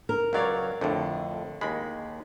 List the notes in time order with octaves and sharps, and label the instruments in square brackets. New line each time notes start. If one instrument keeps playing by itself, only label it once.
[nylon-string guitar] A#4
[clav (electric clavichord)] C#2 F#3 [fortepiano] C#5 D5 F5
[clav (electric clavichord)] F2 A2 [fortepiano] D3
[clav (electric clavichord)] D#2 G#3 [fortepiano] B5